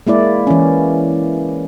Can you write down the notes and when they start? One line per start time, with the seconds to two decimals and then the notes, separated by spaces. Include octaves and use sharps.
0.07 G#3 A#3 E4 D5
0.47 E3 C#4